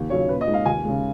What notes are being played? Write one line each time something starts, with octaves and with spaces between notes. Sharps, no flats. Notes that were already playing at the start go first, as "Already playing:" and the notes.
Already playing: D#2
C#3 F#3 C#4 C#5
A#2 B4
D#5
G#3 D#4
F5
D#2 G#5
C#3 G#3